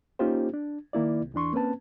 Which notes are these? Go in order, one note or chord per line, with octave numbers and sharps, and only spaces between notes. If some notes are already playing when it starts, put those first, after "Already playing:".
A#3 C#4 D#4 F4 G4 C5
D4
D#3 A#3 E4 D5
C2
E2 E3 D4 C6 C#6
A#3 C4 C#4 B4 A5